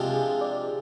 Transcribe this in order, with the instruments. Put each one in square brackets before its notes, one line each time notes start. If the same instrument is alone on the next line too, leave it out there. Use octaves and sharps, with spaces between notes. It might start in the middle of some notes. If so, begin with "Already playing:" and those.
Already playing: [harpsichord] C3 F3 G#3 D4 F4 [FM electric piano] G4
[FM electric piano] G#4
D5